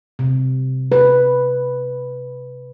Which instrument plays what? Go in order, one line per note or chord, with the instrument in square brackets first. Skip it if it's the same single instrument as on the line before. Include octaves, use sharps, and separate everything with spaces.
[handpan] C3
B4